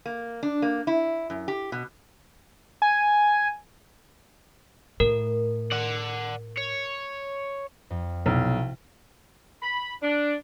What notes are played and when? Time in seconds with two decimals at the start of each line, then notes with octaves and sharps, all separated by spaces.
0.06 A#3
0.43 D4
0.62 A#3
0.87 E4
1.30 F#2
1.48 G4
1.72 B2
2.82 G#5
5.00 A2 A#4
5.72 D5 F#5
6.58 C#5
7.90 F2
8.26 B1 C3 E4 F6
9.62 B5
10.02 D4